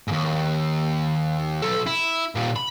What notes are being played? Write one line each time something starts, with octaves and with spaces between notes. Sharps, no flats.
D#2 G#2
B1 A4
E4
A#2 G3
B5